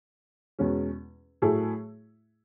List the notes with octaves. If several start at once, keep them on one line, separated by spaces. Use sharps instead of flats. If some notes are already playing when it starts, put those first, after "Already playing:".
E2 B2 G#3 C#4
A2 F#3 A3 E4 G#4